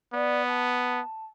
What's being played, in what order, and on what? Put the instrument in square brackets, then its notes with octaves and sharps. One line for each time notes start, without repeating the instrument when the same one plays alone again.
[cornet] B3 [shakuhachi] D5
[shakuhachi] A5